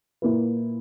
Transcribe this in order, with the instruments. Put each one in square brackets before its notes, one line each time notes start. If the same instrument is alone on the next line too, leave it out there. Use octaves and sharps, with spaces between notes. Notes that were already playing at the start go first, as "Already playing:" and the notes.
[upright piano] A#2 A#3 E4 B4